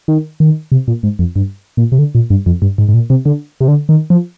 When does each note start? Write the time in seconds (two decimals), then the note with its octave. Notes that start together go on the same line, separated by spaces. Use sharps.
0.08 D#3
0.40 D#3
0.72 C3
0.88 A#2
1.03 G#2
1.19 F2
1.36 G2
1.77 A#2
1.92 C3
1.99 D3
2.15 A#2
2.30 G2
2.46 F2
2.62 G2
2.78 G#2
2.89 G#2
2.94 A#2
3.10 C3
3.26 D3
3.61 C3
3.68 D3
3.89 D#3
4.10 F3